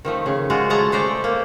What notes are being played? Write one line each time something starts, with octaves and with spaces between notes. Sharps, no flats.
D#3 F3 A3
C#3
G#3 F4 F#4
G#3 A3 A5 A#5
A3 C5 D5 A#5
A#3